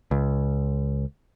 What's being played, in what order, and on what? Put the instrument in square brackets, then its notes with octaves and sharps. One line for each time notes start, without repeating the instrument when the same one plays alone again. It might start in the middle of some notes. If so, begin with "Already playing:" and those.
[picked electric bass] C#2